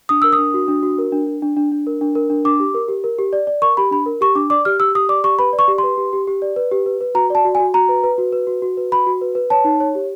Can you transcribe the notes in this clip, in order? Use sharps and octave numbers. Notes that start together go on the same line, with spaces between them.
D4 D#6
A#4 E6
D#6
D4
F#4
D4
F#4
A#4
D4
D4
D4
D4
D4
A#4
D4
A#4
D4
D4 D6
G4
A#4
G4
A#4
G4
D5
D5
A#4 C#6
G4 B5
D4 B5
A#4
G4 C#6
D4 D6
D5 D6
G4 F6
G4 E6
G4 D#6
D5 D6
G4 C#6
B4 B5
D5
C#6
G4
C6
B4
G4
G4
G4
D5
B4
G4
B4
B4
F#4 A#5
D5 A5
F#4
G#5
F#4
F#4 A#5
B4
B4
F#4
B4
F#4
F#4
B4
F#4 B5
F#4
B4
B4
C#5 A5
D#4
C#5
G4